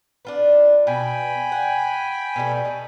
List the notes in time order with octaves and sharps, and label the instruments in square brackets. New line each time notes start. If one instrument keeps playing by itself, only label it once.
[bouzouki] D4 F4 B4
[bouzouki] B2 [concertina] G5 G#5 B5
[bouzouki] F#5
B2 G3 A3
D#4